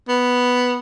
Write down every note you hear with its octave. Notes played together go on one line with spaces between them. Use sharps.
B3